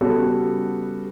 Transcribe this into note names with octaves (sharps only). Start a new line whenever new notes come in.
C#3 G3 B3 F#4 A4